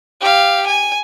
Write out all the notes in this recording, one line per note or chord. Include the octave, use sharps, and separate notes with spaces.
G4 F5
G#5